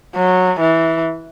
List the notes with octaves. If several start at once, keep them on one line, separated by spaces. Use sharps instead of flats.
F#3
E3